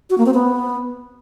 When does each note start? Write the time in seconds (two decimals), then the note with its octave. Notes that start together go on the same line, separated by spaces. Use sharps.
0.10 F#4
0.18 A#3
0.26 C4
0.34 B3